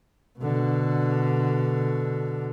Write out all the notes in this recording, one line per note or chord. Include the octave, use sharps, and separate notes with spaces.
B2 D3